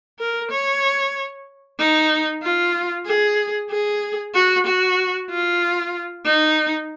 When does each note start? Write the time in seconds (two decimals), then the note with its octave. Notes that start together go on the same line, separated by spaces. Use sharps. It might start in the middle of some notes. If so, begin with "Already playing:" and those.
0.20 A#4
0.51 C#5
1.79 D#4
2.43 F4
3.07 G#4
3.71 G#4
4.34 F#4
4.66 F#4
5.30 F4
6.25 D#4